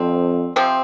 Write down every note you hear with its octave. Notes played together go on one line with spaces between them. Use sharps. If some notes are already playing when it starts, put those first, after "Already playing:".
Already playing: F2 D3 F3 C4
C3 F3 C4